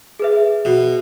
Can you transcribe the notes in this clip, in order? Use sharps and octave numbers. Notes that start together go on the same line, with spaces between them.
G#4 B4 E5
B2